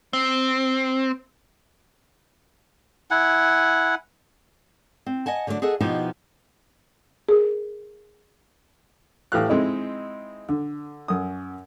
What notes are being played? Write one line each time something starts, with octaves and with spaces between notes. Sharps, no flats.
C4
E4 F#5 G#5
C4
D#5 F#5 G#5 A5
D3 F#3 A3 C4 D4
G#4 A4 D#5 E5 F#5
B2 F3 B3 D#4 E4 G4
G#4 A#4
A2 E3 G4 F5 F6 F#6
G#3 C4 D#4 E4
D3
F#2 D#6